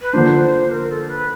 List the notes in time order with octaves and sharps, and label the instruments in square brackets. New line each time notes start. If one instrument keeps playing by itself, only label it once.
[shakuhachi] B4
[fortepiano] D3 F3 A#3 D4 [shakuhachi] C5
[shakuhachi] A#4
A4
B4